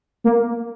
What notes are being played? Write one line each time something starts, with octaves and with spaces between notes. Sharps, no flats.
A#3